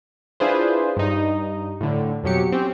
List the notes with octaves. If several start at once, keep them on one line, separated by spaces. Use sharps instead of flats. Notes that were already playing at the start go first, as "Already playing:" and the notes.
D4 E4 F4 G#4 B4 C5
G2 D#4
A2 D3
F2 B2 F#3 G4 C#7
C4 C#4 G4